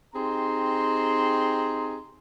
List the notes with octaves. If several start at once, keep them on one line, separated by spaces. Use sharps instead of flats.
C4 D#4 G4 G#4 A#5 C6